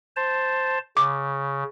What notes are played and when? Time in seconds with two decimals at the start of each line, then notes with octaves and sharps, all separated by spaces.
0.16 C5 A5
0.97 C#3 D6